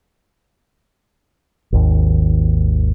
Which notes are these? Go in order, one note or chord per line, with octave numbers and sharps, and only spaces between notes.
G#1 D#2